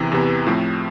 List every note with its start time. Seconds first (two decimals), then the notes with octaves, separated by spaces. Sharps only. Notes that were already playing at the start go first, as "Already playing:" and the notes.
Already playing: E2 C3 E3
0.12 E2 C3 E3
0.47 A2 F3 A3 C4